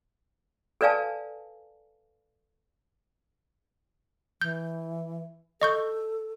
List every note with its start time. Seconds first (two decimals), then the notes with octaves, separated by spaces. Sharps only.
0.81 A4 B4 D5 F5 G#5 A5
4.41 E3 G6
5.62 A4 D#5 C#6 G6